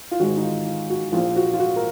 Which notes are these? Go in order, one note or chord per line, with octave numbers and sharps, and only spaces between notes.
F4
G#1 G#2 D#3 G#3 F#4
D#4
F4
F4
F#4
A#1 A#2 F3 F4
F#4
F4
F#4
A#4